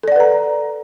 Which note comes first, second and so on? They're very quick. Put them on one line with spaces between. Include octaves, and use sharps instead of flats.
A4 D5 F#5 B4 A#5